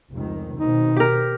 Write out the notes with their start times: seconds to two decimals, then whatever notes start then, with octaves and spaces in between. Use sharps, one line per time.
0.11 F1 C#2 D#3
0.60 B2 D#3 C4 D#4
0.96 G4 A#4